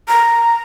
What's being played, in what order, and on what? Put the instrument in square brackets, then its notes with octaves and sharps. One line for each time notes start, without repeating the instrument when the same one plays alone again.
[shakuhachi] A#5